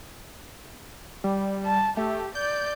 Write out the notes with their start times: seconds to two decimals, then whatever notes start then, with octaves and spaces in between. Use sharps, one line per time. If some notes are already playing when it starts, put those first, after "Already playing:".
1.24 G3
1.66 A5
1.97 A3 G4
2.35 D5 G6